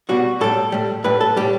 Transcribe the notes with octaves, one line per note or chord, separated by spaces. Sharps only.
B2 G3 F#4
A2 G3 A4
A2 G3
A2 G3 B4
A4
A2 G3 G4